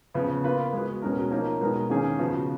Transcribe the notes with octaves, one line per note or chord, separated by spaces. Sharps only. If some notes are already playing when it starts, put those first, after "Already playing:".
C#3 F3 B3
A#3 F4 B4
G#3 B3 F#4
B2 G#3 C#4 F#4 A#4
F3 A#3 D#4 A#4 C#5
B2 G#3 B3 D#4 A#4
D#3 A#3 C#4 G#4 C#5
C#3 F3 B3 F#4